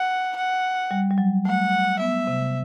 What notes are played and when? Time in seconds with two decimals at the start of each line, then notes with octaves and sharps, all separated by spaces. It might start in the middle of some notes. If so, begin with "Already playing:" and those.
Already playing: F#5
0.36 F#5
0.91 G3
1.10 G3
1.18 F#3
1.45 A3 F#5
2.00 B3 E5
2.27 C3